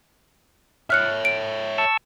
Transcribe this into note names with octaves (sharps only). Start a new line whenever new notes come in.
C#5 E5 F6 F#6 C#7
D7
A5 C#6 E6